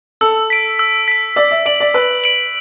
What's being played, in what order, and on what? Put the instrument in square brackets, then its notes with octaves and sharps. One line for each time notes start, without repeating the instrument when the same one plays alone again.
[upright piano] A4 [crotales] E6
[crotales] B6 D7
E6
B6 D7
[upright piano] D5 [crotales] E6
[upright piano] E5
[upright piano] D5 [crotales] D7 F#7
[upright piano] D5
[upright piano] B4 [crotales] E6
[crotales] D7 F#7